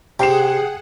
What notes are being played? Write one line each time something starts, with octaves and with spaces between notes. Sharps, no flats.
C3 G#4 F#5 G5 C7 E7